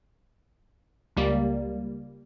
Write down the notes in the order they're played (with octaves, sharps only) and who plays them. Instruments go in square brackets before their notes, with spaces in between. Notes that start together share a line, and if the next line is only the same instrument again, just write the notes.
[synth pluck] C#2 G3 A#3